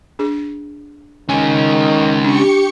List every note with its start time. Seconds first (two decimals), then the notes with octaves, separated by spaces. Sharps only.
0.19 D4 G#4
1.29 D#3 G#3 C#4 G#5
2.24 D4 G4 C#6 C#7